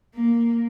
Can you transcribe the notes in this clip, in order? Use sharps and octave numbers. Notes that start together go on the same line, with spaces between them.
A#3